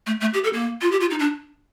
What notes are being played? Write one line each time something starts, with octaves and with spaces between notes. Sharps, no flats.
A3
A3
G4
A4
A#3
F4
G4
F4
D#4
D4